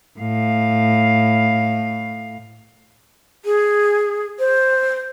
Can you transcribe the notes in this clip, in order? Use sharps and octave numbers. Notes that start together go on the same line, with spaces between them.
A2 F5
G#4
C5